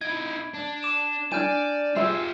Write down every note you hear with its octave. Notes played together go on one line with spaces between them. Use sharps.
D#4 E4 G#6 D7
D4
D6 E7
D4 G#4 D5 G#5 F6 G6 D#7
F4 G4 G#4 C5 E5